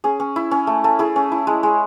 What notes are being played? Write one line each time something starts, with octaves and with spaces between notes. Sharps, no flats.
C#4 G#4
C#4
E4
C#4
A3
A3
E4 G#4
C#4
E4
G#3
G#3